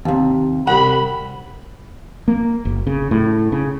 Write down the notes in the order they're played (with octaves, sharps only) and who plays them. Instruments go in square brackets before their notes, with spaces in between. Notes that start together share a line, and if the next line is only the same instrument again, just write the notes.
[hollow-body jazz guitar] D#2 C3
[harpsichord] C2 [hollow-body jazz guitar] G4 F#5 [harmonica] B5
[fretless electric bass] A#3
F#1
C#3
A2
C#3